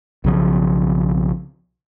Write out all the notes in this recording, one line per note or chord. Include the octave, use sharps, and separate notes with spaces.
B1 C#3 F3